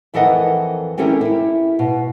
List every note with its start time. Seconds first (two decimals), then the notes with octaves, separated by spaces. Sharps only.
0.14 F2 E3 A4 A#4 D#5 F#5
0.97 C4 C#4 E4 G4 A4 A#4
1.21 E4 G4
1.79 B2